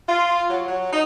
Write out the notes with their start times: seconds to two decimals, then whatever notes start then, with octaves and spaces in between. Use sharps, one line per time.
0.08 F4
0.49 F#3
0.68 F#3
0.92 D#4